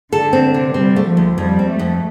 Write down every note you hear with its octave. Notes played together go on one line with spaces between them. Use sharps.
D3 A4
C4
C3
G3 C4
A3
F3
D2
F2 G3
C4
A3
F2